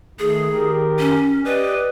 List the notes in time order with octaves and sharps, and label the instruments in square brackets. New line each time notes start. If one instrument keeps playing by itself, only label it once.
[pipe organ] D#3 A3 [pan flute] G#4
[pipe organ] D#3 G4 A#4
[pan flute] C#4
[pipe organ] G4 D5 D#5 [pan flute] B4